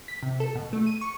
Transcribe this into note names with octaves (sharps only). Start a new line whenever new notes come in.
B6
C3
A4
B2
A3
D#7
C#6